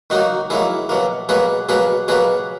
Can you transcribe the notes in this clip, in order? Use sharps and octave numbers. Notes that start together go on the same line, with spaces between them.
D#3 F#3 A#3 D#4 F#4
D#3 F#3 A#3 E4 G#4
B2 F#3 A#3
B2 F#3 A#3 G#4 B4
B2 F#3 A#3 G#4 B4
B2 F#3 A#3 G#4 B4